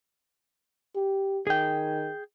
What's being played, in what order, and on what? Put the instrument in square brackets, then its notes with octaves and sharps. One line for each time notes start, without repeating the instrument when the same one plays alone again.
[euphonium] G4
[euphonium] D#3 [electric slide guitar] G#4 G5